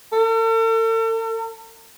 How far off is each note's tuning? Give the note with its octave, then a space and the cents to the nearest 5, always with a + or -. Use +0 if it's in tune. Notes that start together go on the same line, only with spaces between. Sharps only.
A4 +45